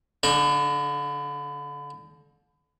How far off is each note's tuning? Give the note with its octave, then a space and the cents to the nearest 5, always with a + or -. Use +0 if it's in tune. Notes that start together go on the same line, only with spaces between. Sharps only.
D3 -35 D4 +25